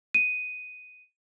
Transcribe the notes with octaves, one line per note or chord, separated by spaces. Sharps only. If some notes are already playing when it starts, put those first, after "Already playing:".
D#7